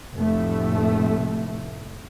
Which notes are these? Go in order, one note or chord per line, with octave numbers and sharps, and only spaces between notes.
F1 A2 A3